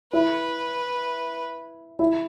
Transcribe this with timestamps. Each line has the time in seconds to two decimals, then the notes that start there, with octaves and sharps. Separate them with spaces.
0.13 E4 B4
1.99 E4